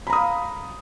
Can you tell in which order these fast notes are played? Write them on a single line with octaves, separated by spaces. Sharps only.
B5 A#5 D#6 F5